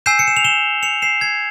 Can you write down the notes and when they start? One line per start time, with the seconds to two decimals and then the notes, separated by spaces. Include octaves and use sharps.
0.06 G#5 E6 G6 C7 E7
0.19 C#7
0.27 E7
0.37 F7
0.44 E7 G7
0.83 C#7 F7
1.02 C7 E7
1.21 G#6 C7